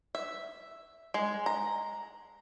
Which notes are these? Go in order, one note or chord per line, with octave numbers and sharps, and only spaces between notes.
E5
G#3
A#5